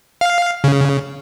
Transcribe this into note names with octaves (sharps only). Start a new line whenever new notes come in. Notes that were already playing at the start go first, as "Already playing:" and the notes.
F5
C#3